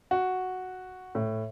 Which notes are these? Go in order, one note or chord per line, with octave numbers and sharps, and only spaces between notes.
F#4
A2